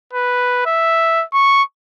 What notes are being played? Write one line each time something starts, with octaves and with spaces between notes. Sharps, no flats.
B4
E5
C#6